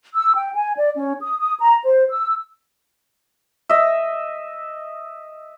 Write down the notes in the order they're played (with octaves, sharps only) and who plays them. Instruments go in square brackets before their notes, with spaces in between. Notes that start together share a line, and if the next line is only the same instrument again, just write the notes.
[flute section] E6
G5
G#5
D5
C#4
D#6
D#6
A#5
C5
E6
[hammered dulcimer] D#5 E5